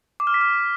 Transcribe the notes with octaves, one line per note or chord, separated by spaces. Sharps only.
D6
F6
B6
F6